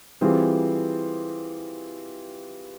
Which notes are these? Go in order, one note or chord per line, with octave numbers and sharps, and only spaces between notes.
E3 G3 C4 F4 G#4